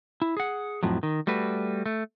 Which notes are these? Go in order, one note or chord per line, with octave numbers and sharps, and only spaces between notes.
E4
G#4 F#5
F2 A2 F3 F#3
D#3
G3 A3 F#4 B4
A3